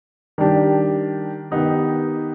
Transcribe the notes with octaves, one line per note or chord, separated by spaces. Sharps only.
D#3 G3 D4 G4
D#3 B3 D#4 G4